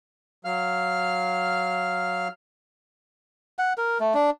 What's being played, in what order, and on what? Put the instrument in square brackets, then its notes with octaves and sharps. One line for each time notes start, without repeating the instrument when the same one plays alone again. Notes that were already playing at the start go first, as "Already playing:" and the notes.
[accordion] F#3 F5 F6
[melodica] F#5
A#4
A3
D4